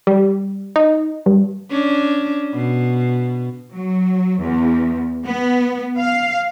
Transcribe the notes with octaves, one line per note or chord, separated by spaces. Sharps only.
G3
D#4
G2
C#4 D4
B2
F#3
E2
B3
F5